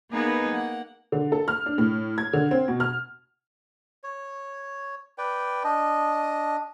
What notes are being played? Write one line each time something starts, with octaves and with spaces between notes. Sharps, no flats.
A#3 B3 D#4 G#4 B4
A#3 F#5
D3
A4
F6
D4
A2
G#6
D3
C4
B2
F6
C#5
B4 D5 G5
D4 D#5